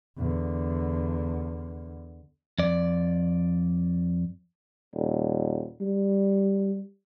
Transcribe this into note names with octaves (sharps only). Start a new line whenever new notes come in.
E2 D3
F2 D5
D#1
G3